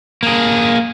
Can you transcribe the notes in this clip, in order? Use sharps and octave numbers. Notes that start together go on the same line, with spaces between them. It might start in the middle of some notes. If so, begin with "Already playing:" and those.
A#3 G#4